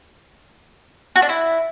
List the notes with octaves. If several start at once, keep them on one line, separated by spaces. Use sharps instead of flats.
F#4
D4
E4